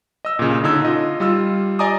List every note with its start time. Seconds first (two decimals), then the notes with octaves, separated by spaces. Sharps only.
0.25 D#5 E6
0.39 A#2 C#3
0.64 D3 D4 D#4 C#5 E6 G#6
0.81 F4 D#5
1.20 G3 F4 E6
1.79 D5 D#5 G#5 A#5 D6 D#6